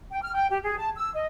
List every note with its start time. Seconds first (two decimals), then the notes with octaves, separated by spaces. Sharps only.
0.12 G5
0.23 F6
0.35 G5
0.51 G4
0.63 G#4
0.78 A5
0.96 E6
1.14 D#5